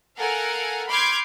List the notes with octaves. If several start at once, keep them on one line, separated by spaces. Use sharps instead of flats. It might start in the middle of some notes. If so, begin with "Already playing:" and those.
A4 A#4 F5 F#5 G#5
B5 C6 D6 F6 G6 G#6